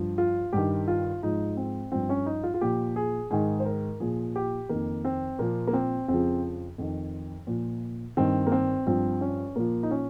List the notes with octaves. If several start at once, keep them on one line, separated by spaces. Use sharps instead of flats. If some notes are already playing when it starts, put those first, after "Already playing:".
Already playing: G2 F3
F4
G2 D#3 G4
F4
G#2 F3 D#4
C4
G2 F3 C4
C#4
D#4
F4
F4
A#2 F3 G4
G#4
G#2 D#3 G#4
C5
A#4
A#2 F3 G#4
G4
F2 D#3 A#3
C4
A#2 F3 A#3
A#3
C4
F2 C#3 F3 C4
F2 D#3
A#2 F3
G2 D#3 C4
A#3
C4
G2 F3 C4
C#4
A#2 F3 A#3
D#4
C#4